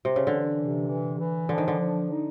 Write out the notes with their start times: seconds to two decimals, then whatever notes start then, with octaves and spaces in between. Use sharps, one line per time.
0.05 C3
0.16 C#3
0.27 D3 E3
0.58 C3
0.88 E3
1.19 E3
1.49 D3 F3
1.58 D#3
1.68 D3
1.79 F3
2.11 D#4